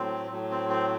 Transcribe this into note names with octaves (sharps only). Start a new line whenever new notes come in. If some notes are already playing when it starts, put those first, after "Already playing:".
Already playing: A2 F#3 C4
A2 F#3
C4
C4